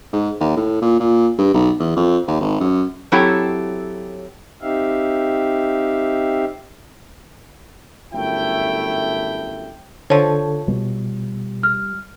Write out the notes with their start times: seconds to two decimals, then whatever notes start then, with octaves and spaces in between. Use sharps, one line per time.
0.13 G#2
0.40 D#2
0.57 A2
0.82 A#2
1.00 A#2
1.39 G2
1.54 B1
1.79 E2
1.97 F2
2.28 D#2
2.41 G#1
2.60 F#2
3.12 F#3 C4 E4 G4 A4 C#5
4.62 C4 D#4 G4 E5 F5
8.14 G1 F#2 A3 E4 G5
10.10 D3 F3 A4 C#5
10.68 B2 G3
11.63 F6